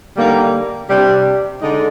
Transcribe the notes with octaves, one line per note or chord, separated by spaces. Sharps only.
D3 G3 A#3 D#4
C3 G3 D4 G4
D3 G#3 D#4